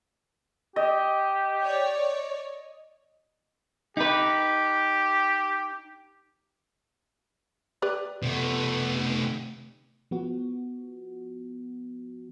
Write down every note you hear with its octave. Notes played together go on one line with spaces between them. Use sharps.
G4 D#5
C#5 D5
D#4 G4 B4
G4 B4 D5
C3 A3 B3
F3 B3 F#4